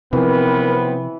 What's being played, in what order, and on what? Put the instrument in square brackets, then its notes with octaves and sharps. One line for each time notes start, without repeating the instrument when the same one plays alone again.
[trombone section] B1 B3 C4 [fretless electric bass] C3 F3 [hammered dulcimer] E3 [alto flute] A#4